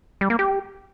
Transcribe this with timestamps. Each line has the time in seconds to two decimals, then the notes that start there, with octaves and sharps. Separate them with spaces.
0.21 G3
0.30 A#3
0.39 G4